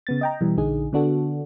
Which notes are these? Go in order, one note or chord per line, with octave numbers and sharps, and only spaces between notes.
C#3 B3 A6
D#5 G5 A#5
B2 E3 G3
A#1 D3 D#4 G#4
D3 B3 D4 F#4 A4